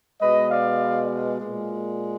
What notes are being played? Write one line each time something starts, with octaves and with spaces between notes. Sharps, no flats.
B2 G#3 B4 D#5
D5 F5
A#2 G#3